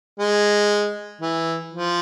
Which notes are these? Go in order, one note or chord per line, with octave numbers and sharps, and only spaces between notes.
G#3
E3
F3